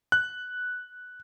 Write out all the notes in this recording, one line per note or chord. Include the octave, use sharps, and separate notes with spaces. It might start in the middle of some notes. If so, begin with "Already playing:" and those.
F#6